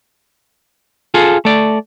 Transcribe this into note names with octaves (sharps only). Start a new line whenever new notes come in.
F4 G#4 A4
A3 D5